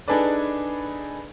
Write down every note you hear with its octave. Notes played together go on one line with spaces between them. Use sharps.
D4 D#4 G#4 A4 B4 D5